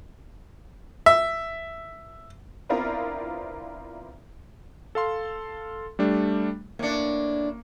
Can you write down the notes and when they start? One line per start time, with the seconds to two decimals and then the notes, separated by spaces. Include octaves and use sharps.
1.06 E5
2.69 B3 C4 D4 E4 F4 A#4
4.95 A4 F5 C6
5.99 G3 A3 D4
6.79 A2 A#3 D4 C#7